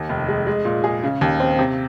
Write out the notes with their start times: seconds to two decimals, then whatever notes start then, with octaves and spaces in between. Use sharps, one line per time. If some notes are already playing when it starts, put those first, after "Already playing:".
Already playing: D#2
0.09 F1
0.28 G#3
0.47 G#3
0.65 A#2
0.84 G#4
1.03 C#3
1.21 D#2
1.40 C4
1.59 C3